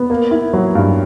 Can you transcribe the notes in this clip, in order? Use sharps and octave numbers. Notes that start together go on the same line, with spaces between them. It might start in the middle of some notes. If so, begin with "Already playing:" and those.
Already playing: B3
A#3
E4
F#3
G2